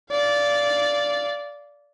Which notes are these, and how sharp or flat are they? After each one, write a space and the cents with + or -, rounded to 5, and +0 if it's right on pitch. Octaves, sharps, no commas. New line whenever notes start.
D5 -15 F5 -10